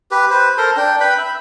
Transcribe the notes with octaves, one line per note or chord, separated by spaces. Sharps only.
G4 B4
B4 C5
A4 A#4 C5 C6
D4 G5
B4 G5 B5
E5 B5